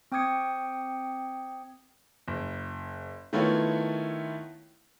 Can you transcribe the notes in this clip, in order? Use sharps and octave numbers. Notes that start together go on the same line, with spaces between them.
C4 G5 D6 D#6 G#6 C#7
F#1
D#3 A3 B3 E4 F4 C#5